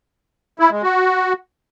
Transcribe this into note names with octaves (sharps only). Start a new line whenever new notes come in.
E4
G#3
F#4